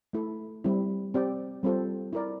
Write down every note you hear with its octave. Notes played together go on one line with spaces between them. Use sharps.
A3 E4 A4
G3 C4 E4
C4 G4 D5 G5
G3 C4 F4 A4 C5
E4 A#4 D5